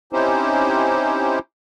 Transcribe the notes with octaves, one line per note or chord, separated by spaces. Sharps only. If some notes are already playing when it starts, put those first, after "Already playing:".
C4 C#4 D#4 E4 G4 C5